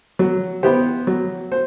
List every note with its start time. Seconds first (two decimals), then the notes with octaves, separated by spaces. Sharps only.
0.19 F#3
0.63 B3 E4 G4 C5
1.07 F#3
1.52 C5